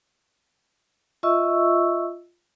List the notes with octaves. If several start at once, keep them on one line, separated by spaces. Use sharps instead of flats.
F4 D#5 E5 C#6 E6